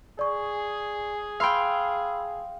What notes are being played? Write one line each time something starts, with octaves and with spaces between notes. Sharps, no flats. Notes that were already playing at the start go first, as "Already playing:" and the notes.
G#4 D5 C#6
F5 G5 B5 C6 E6